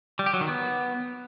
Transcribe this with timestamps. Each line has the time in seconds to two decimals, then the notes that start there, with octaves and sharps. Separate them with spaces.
0.19 G3
0.26 G4
0.34 F#3
0.41 D#3
0.48 B3